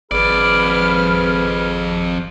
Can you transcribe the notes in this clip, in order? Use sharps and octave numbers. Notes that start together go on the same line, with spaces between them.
G#1 F2 G#4 B4 D5 B5 F6